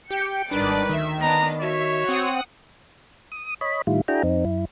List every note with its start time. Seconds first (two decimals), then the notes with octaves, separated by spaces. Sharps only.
0.11 G4 G5 C#7
0.51 G#1 D#3 G3 D4 B4 D5
0.89 D2 D#3 E5
1.21 B3 D4 D#5 A#5
1.61 F#4 C#5 E5
2.09 C4 F#5 D#6
3.32 D#6
3.61 C#5 D#5 B5
3.87 A2 D#3 G3 E4 F4
4.08 D4 E4 F#4 G#4 G5 A#5
4.23 F2 C4 D#4
4.45 F#2 E4